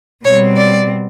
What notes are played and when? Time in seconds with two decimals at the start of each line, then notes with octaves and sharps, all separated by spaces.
0.24 B2 G3 C4 C#5
0.57 D5